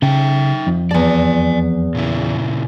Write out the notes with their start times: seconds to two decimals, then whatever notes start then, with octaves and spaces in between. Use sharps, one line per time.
0.02 C#3 D#4 E5 G5
0.67 F2
0.91 E2 D5 G#5 A5
1.95 A#2 C#3 E4